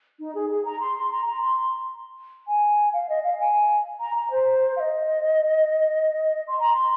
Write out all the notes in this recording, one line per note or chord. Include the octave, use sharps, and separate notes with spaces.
D#4
G#4
G#4
A#5
C6
C6
A#5
A#5
C6
G#5
F5
D#5
F5
G#5
A#5
A#5
C5
F5
D#5
C6
A#5
C6